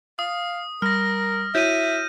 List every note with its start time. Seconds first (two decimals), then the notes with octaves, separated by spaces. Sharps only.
0.19 F5 D#6
0.82 G3 A#4 F6 A#6
1.55 E4 F#4 C#5 E5 G6 D#7